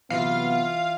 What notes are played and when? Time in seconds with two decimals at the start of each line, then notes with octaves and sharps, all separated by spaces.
0.10 C3 E3 F#3 B3 F4 E5 F5